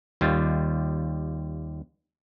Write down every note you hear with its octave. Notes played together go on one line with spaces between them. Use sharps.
D#2 G3 F4